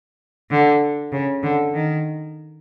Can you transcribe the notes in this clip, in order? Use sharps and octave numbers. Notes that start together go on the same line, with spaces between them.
D3
C#3
D3
D#3